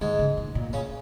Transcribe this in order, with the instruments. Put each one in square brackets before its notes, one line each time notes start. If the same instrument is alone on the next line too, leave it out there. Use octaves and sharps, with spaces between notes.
[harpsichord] G#2 G#3 [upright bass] D#3
[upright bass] C#3
A#2
A#2
[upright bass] A#2 [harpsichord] C#3 C#4